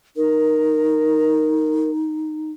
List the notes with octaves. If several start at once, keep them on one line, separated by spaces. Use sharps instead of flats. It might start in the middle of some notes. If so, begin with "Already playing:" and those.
D#4 A#4